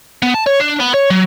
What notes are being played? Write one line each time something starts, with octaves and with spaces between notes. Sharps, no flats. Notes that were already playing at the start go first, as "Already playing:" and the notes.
B3
A5
C#5
D4
B3
C#5
F#3